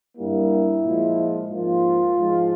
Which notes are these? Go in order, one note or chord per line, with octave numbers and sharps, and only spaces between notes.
G2 G3 A#3 E4
A#2 F3 G#3
G#2 F3 A#3 F4
G#2 F3 G#3